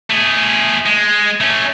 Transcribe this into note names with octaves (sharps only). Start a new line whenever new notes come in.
A3 G#4
G#3
A3 C#4